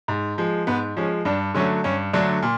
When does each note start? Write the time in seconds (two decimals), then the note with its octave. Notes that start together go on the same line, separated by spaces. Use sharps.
0.08 G#2
0.38 F3 G#3
0.67 G#2 B3
0.97 F3 G#3 C#4
1.25 G2 D4
1.54 D3 F#3 A3 C#4
1.84 G2 C#4
2.13 D3 F#3 A3 D4
2.42 A#2